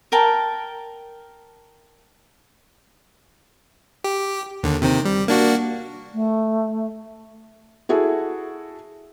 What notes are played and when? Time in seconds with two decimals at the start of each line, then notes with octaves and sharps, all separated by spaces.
0.12 A#4 G5 A5
4.04 G4
4.63 D#2 D3
4.81 C3 D#3 C4
5.05 G3
5.28 A#3 D4 F#4
6.13 A3
7.89 E4 F#4 G#4 A4